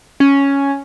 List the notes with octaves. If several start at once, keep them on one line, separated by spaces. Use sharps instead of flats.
C#4